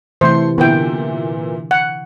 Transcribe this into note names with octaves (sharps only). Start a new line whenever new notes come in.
C3 E3 A3 C5 C6
A#2 D3 E3 B3 E4 G5
F#5